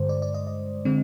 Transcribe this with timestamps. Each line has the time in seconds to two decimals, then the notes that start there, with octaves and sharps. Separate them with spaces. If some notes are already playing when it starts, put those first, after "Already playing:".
Already playing: G2 D3 G#3 C5
0.09 D5
0.22 D5
0.34 D#5
0.47 D#5
0.85 D3 G#3 C4